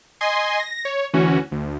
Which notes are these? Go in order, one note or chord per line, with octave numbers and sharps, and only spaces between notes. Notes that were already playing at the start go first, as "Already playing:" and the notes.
D#5 G#5 C6
A#6
C#5
D2 E3 C#4 F#4
D2